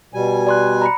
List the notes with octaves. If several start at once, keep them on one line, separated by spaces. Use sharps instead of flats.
B2 G3 G#5
D5 C6 F#6
A#5 B5 C#7